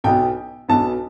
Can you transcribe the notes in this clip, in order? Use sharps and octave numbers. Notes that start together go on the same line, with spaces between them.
B1 B2 B3 G5
B1 B2 B3 A5